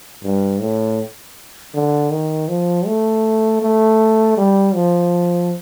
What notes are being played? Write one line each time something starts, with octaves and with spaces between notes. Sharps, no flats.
G2
A2
D3
D#3
F3
A3
A3
G3
F3